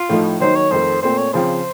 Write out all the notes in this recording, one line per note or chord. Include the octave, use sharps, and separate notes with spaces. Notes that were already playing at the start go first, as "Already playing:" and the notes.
Already playing: F4
A2 F3 A3 D#4
D#3 F#3 A#3 D#4 C5
C#5
F2 D#3 A3 C5
A#2 A3 C4 C5
C#5
C#3 F3 C4 C5